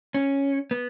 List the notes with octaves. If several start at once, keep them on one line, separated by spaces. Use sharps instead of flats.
C#4
B3